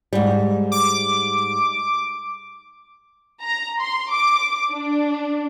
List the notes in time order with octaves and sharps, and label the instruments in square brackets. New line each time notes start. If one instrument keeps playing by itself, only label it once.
[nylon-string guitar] G#2 G3
[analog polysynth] D6
[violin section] A#5
C6
D6
D4